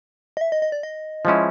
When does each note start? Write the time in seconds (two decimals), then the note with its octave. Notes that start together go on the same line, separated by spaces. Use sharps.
0.37 D#5
0.41 E5
0.52 D#5
0.62 D#5
0.72 D5
0.83 D#5
1.25 F3 G#3 C#4 E4